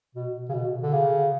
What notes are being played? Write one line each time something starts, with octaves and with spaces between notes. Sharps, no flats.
B2
C#3
B2
D3
C#3